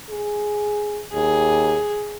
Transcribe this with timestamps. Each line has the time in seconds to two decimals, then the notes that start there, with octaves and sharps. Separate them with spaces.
0.10 G#4
1.14 D#2 G#4